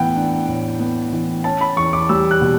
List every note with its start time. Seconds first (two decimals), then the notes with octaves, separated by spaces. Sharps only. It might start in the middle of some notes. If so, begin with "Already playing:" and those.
Already playing: A2 E3 B3 F#5 G5
0.16 D4
0.48 A2
0.80 B3
1.12 E3
1.44 C#4 A5
1.61 B5
1.77 E2 C#6
1.93 D6
2.09 G3 E6
2.31 F#6
2.41 B2